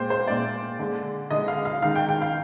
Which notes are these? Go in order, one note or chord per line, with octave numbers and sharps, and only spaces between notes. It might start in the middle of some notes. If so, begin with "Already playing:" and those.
Already playing: A#2 G#3 C5 G5
C5
A#2 G#3 D5
D3 G#3
D3 G#3 D#5
F5
F5
D#3 G#3 F5
G5
G5
F5